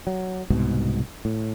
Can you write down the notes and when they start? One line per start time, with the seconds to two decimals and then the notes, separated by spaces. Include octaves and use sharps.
0.07 F#3
0.50 C2 G#2 B2
1.25 A2